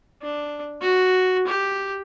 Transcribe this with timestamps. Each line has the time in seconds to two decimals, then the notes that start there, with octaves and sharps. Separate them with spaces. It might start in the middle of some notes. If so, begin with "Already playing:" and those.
0.22 D4
0.81 F#4
1.47 G4